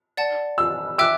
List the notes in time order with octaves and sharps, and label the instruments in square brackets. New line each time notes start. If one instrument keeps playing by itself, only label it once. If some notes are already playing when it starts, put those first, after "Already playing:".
[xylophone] D5 F#5 A5
[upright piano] E6
[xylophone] E5 G5 D6 F#6 [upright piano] E6